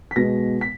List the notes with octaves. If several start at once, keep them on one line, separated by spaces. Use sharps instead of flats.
B6
B2 G#3 B3 A#6
B6